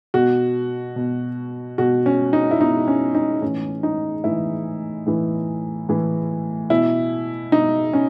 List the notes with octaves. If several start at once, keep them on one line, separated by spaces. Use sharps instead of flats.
B2 F#4
B2
B2 F#4
C#4
D#4
E4
B2 D#4
C#4
D#4
A2 E3 C#4
D#4
A2 E3 E4
A2 E3
A2 E3
B2 E4
B2 D#4
C#4